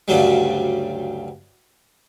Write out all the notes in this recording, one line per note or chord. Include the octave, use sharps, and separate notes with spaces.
D2 G2 C#3 F#3 G3